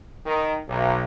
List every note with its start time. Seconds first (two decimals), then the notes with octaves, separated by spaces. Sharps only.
0.25 D#3
0.68 B1